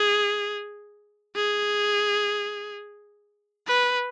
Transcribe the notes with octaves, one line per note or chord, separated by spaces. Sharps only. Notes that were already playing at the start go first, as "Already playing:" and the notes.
Already playing: G#4
G#4
B4